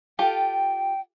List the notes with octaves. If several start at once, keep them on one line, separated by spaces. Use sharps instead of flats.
F4 G4 A4 G5